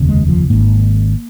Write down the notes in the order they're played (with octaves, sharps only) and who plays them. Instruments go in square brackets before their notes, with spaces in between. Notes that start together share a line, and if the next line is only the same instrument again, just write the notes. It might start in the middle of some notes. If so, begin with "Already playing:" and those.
Already playing: [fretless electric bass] F1 D#2 C#3
G#3
F3
G#1 G#2 A#3